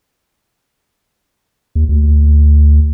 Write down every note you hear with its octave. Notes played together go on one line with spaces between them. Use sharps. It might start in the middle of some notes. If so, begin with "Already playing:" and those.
D#2
D2